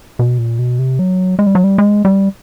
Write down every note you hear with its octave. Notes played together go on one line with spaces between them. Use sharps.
B2
A#2
B2
C3
F#3
G#3
G3
F#3
G3
G#3
G3